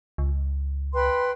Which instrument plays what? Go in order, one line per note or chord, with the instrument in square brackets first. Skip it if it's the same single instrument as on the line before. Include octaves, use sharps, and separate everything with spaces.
[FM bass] C#2
[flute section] B4 G5 C6